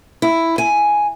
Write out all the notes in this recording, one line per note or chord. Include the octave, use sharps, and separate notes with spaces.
E4
G#5